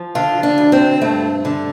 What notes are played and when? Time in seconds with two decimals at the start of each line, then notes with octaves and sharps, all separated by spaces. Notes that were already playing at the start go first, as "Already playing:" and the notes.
Already playing: F3
0.15 D3 F4
0.43 D4
0.58 D2
0.72 C4
1.01 G2 A3
1.45 D3